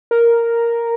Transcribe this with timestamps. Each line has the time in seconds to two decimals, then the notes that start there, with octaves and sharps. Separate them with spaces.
0.11 A#4